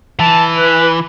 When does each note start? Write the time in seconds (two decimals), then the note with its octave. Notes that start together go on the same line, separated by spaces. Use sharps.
0.19 E3 A5
0.58 B4